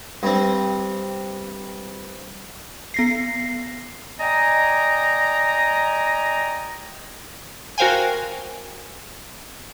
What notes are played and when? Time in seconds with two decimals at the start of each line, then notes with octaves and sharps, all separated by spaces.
0.23 G2 C4
2.94 B3 A#6 C7
4.20 D5 D#5 G5 G#5 A#5
7.78 F#4 A#4 C5 F5 G5 G#5